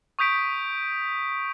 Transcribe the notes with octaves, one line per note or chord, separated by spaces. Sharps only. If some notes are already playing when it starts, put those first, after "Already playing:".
C#6 D#6 G6 B6 D7